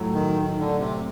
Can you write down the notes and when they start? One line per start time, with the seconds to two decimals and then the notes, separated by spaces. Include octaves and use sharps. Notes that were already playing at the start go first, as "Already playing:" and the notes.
Already playing: A2 F#3 A3
0.14 D#3
0.41 D#3
0.60 D3
0.79 C3